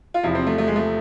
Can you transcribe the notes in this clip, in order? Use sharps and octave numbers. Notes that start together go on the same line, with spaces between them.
F4
E2 C3 F3 E4
C4
A3
A3
G#3
A3